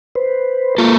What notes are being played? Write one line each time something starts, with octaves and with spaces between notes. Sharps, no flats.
B4 C5
A#3 F4 A4